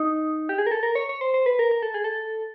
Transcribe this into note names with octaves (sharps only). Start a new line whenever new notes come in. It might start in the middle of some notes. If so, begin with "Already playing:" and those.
Already playing: D#4
G4
G#4
A#4
A4
A#4
C#5
C#5
C5
C5
B4
A#4
A#4
A4
G#4
A4